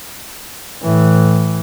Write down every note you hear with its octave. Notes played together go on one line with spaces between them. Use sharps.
A2 E3